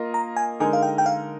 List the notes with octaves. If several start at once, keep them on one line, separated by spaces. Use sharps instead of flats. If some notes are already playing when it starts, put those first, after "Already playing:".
Already playing: A#3 F4 A#4 D#5
A#5
G#5
D3 G#3 D#4 A#4 G#5
F5
G5
G5
F5